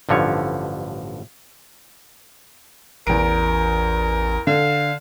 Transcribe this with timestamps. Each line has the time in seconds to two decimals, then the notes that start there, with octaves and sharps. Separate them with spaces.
0.09 A1 G2 D3 F3 C#5
3.07 A1 E2 A#4 D7
4.47 D3 F5